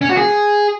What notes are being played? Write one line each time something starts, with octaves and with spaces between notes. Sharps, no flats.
C#4
F#4
G#4